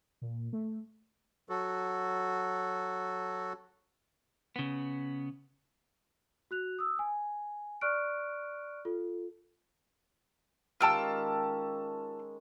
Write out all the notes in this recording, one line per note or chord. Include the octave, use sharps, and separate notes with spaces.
A#2
A3
F#3 F#4 A4
C#3 B3
F#4 F#6 F7
D#6 E6
G#5
D5 C#6 F6 F#6 D7
F4 A4
D#3 G#3 C#4 F4 G4 A5 E6 F6